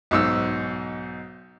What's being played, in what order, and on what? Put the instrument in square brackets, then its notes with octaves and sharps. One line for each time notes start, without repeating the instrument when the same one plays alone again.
[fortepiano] B1 G#2 E6